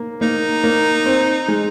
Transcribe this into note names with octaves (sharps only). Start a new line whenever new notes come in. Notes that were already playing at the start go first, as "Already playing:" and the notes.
Already playing: A#3
A#3 D#4
A#3
C4
G#3